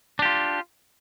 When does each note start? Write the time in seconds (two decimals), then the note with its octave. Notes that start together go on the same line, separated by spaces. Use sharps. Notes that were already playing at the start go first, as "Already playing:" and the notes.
0.19 D4
0.22 G4
0.25 F4